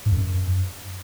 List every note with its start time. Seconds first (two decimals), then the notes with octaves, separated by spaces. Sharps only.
0.06 G#2
0.11 F2
0.17 F#2